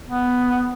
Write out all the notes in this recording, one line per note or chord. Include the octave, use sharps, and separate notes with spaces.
B3